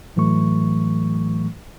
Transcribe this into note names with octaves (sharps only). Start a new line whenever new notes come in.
A2 E3 F#3 A3 C#6